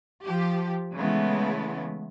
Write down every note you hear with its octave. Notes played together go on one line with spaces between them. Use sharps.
F3 G4
C#3 E3 G#3 A3 B3